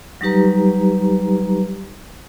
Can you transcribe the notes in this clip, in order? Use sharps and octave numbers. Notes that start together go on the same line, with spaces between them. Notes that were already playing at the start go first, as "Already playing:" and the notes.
F#3 G3 D#4 G4 B4 A#5